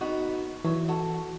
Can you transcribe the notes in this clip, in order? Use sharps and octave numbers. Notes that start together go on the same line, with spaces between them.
B3 D#4 F#4
E3 F#3
F#4 A4